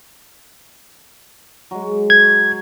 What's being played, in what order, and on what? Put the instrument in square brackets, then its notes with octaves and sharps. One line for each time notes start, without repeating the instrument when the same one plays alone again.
[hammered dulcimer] F#3 G#3
[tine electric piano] G#6